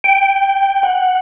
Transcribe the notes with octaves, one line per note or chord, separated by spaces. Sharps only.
G5
F#5